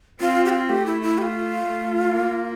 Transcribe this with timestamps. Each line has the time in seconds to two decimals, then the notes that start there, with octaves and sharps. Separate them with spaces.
0.21 C4 F4
0.45 G4
0.49 F4
0.69 A3 G4
0.86 E4
1.02 E4
1.18 G4
1.22 F4
1.67 A3
2.15 A#3